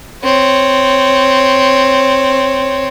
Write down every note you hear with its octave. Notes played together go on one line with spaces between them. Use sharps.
C4 C#5